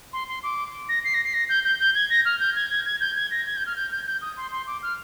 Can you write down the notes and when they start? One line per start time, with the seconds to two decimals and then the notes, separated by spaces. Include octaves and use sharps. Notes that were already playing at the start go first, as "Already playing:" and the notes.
0.13 C6
0.29 C6
0.43 D6
0.89 A#6
1.04 C7
1.14 A#6
1.24 C7
1.34 A#6
1.49 G6
1.64 G6
1.80 G6
1.95 G#6
2.10 A#6
2.25 F6
2.40 G6
2.56 G#6
2.70 G#6
2.86 G#6
3.01 G6
3.16 G#6
3.31 A#6
3.46 G#6
3.56 G6
3.66 F6
3.76 G6
3.91 G6
4.07 G6
4.22 D#6
4.37 C6
4.52 C6
4.67 D6
4.83 F6